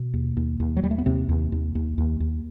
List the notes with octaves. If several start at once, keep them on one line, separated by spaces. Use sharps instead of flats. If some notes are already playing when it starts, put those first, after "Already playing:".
Already playing: B2
D#2
D#2
D#2
F#3
D#2 G3
A3
B3
D#2 C3 C4
D#2
D#2
D#2
D#2
D#2